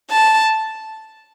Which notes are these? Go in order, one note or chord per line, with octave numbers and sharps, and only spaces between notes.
A5